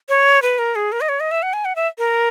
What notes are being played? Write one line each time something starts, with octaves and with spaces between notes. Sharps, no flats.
C#5
B4
A#4
G#4
A#4
D#5
C#5
D#5
E5
F#5
G#5
F#5
E5
A#4